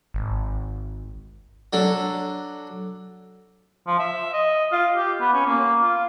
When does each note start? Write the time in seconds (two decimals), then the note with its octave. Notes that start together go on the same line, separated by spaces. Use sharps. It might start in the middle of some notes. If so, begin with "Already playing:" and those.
0.14 G#1
1.73 F#3 D4 A4
3.87 F3
4.00 E5
4.33 D#5
4.72 F4
4.96 G4
5.21 B3
5.34 C#4
5.46 A#3
5.82 F4